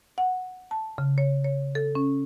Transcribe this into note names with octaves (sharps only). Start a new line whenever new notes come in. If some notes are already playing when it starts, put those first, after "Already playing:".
F#5
A5
C#3
C#5
C#5
A4
C#4